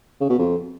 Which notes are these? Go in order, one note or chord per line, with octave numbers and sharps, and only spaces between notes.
C#3
B2
F2